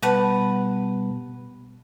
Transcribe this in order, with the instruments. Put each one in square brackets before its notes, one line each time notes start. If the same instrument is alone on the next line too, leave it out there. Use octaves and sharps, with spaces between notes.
[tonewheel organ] B2 G3 B3 [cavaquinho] B4 F#5 A5